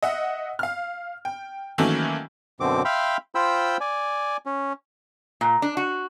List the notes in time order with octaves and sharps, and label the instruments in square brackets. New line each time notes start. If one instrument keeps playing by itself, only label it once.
[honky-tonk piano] D#5 E5 F#5
F5 F6
G5
D#3 E3 F#3 A3 A#3 C#4
[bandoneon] F#2 B2 D3 C4 D6
E5 F5 G5 B5 C6 F6
F4 C5 G5 B5 E6 G6
D5 G#5
C#4
[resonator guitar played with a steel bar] A#2
D4
F#4